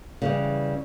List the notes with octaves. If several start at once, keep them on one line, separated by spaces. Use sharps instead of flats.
C#3 E3 G3